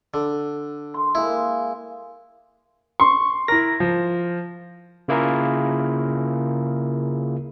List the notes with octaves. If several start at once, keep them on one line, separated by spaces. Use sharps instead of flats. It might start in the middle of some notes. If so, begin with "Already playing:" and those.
D3
A4 C6
G#3 A#3 E4
C6 C#6
E4 A#4 A#6
F3
C#3 A#3 E4 F4 G#4 A#4